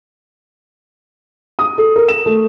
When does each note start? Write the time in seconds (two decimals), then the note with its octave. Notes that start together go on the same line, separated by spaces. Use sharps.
1.59 D#6
1.78 A4
1.96 A#4
2.08 E7
2.26 A3